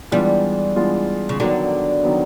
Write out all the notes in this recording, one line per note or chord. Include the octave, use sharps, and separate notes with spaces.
E3 G3 G#3 B3 D4 F4
E3 G#3 B3 D4 F4
C#3
D3 D#3 F#3 B3
D#3 F#3 B3